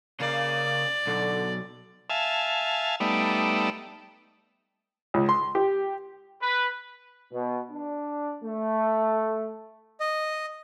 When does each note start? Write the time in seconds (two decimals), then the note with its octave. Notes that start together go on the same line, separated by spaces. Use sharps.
0.20 C#3 A#3 D5
1.07 B1 D3
2.10 E5 F5 G#5 A5
3.00 G3 A3 B3 D#4 D5 E5
5.14 C#2
5.29 C6
5.55 G4
6.42 B4
7.32 B2
7.71 D4
8.44 A3
10.00 D#5